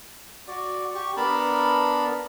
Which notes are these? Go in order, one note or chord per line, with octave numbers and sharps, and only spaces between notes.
F#4 D5
G4 C#6
B3 D4 A#4 A5 B5